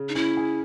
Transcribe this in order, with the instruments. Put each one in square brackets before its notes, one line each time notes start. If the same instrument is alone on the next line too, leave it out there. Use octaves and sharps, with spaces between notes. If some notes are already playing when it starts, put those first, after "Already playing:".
Already playing: [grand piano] C#3
[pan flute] D#4
[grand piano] C#4 [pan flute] E4
[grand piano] G#4